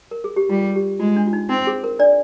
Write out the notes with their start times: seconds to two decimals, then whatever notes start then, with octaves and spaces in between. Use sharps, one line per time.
0.11 A#4
0.24 G#4
0.36 G4
0.50 G3 F4
0.76 G4
1.00 G#3 F4
1.16 D4
1.27 F4
1.33 D#4
1.49 C4 D#4
1.67 G#4
1.84 A#4
1.99 D4 D5